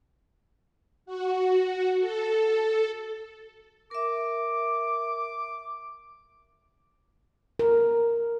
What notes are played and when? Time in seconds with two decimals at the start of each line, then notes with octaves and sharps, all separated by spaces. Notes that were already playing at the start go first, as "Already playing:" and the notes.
1.06 F#4
2.00 A4
3.91 A#4 E5 D6
7.59 A#4